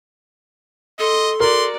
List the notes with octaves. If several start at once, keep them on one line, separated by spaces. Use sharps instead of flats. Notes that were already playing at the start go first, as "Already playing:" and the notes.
A4 D#5 C6
F#4 A#4 D5 C6